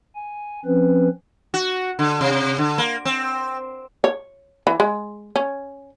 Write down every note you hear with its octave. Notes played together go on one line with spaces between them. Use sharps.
G#5
F3 C4 C#4 B4
F#4
D3
C3
D3
A#3
C4
C#5
E3
G#3
C#4